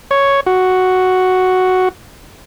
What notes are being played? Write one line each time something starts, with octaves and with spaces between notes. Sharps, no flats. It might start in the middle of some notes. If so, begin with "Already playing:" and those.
C#5
F#4